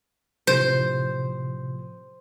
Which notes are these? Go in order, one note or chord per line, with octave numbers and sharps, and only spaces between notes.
A2 C3 F3 C5